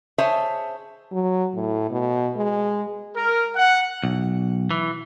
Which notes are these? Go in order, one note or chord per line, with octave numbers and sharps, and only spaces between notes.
G#4 C5 C#5 D#5 E5 A5
F#3
A2
B2
G#3
A#4
F#5
B1
E3